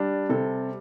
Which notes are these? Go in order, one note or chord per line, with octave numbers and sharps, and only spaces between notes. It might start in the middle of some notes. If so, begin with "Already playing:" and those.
Already playing: G3 D4
C3 A4